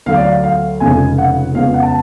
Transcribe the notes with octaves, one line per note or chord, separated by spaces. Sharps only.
D2 D3 F#3 F5
D5
F5
F5
F1 F2 C#3 G#3 G#5
F#5
F2 C#3 G#3 B3 F5
F#5
A5